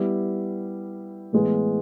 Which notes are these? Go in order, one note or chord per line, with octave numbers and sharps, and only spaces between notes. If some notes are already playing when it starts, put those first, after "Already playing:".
Already playing: G3 B3 E4
A2 E3 G#3 B3